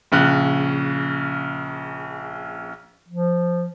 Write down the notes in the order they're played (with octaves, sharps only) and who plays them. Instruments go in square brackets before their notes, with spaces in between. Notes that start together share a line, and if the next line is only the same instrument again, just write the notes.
[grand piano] A#1 C#3 F#6
[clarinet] F3